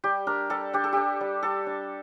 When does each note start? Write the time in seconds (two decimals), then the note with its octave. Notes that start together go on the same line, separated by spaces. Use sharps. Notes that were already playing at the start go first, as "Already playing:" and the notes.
0.04 G3 G4
0.27 D4 A#4
0.50 G3 A4
0.73 D4 G4
0.84 A4
0.93 D4 G4
1.21 G3
1.43 G3 A4
1.67 D4